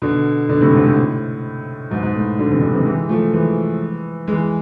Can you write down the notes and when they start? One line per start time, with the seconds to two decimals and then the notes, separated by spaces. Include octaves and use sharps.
0.02 B2 D3
0.49 B2 D3
0.61 A2 C3
0.73 G#2
0.85 A2
1.91 G#2 B2
2.03 G#2 B2
2.15 A2
2.39 B2 D3
2.50 C3 E3
2.62 B2 D3
2.74 C3 E3
2.86 E3 G#3
3.09 F3 A3
3.33 E3 G#3
4.27 E3 G#3